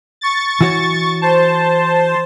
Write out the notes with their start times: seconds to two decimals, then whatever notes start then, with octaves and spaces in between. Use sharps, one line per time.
0.21 C#6 A6
0.61 E3 F#4 C#5
1.22 C5 A5